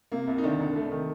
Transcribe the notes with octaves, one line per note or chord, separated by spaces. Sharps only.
C3 A#3
C2
D#4
D3 D#3 D4
C2
C3 A3
D#3